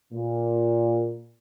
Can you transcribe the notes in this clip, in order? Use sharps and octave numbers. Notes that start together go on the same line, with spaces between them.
A#2